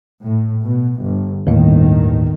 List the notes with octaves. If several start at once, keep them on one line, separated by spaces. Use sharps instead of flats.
A2
B2
G1
G1 D#2 A2 D#3